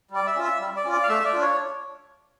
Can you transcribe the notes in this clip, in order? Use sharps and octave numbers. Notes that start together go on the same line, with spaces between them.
G3 D5
E5
C#4 F4
E5
G3
D5
C#4 F4
D5
F5
A3 E5
D5
D4 F4
C#5